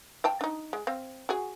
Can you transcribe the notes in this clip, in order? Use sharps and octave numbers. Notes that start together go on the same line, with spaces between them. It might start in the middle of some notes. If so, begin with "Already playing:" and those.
F5 G5 A5
D4 D#4
G#3
C4 F5
F#4 G#4 G#5